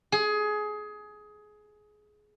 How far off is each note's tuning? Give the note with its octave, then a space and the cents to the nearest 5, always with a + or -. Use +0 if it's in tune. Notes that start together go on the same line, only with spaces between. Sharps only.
G#4 +20